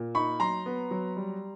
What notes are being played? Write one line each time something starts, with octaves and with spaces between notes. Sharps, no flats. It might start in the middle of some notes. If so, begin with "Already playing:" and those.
Already playing: A#2
D#4 B5 C#6
F#3 A#5 C6
B3
F#3
G3